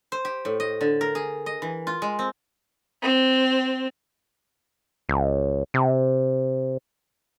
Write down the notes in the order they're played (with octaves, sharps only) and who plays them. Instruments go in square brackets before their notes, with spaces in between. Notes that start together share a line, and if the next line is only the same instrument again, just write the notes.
[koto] C5
G4
A2
D#5
D3
A#4
G#4
D#5
E3
F4
G#3
C4
[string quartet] C4
[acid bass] C#2
C3